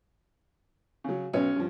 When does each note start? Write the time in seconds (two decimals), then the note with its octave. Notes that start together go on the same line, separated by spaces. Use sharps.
1.04 C#3 F#3
1.33 B1 B3 C#4
1.56 G2 F3